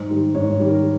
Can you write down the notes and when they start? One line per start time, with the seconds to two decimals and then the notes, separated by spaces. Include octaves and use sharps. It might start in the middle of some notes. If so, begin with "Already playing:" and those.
Already playing: G#2 C5
0.10 D#3 G3
0.35 G#2 C#5
0.60 D#3 G3
0.68 A#4